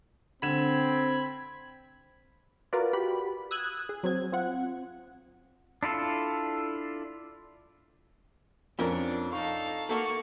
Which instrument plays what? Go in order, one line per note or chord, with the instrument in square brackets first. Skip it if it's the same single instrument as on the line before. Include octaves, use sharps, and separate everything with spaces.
[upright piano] D3 E7 [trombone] C4 [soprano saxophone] B5 [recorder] G#6
[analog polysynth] F4 F#4 A#4 B4 D5
F#4 G4 B5
D#6 E6 F#6 G#6
G#4
F#3 C4 G#6
C4 F4 F#5
[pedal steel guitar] D4 E4 F4 A4
[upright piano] F2 [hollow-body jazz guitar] C#4 A#4 [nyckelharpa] D4
[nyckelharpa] D#4 [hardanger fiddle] A4 F5 [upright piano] C#6
[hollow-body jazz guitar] A3 A4 [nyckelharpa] A#3 [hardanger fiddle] F#4 C#6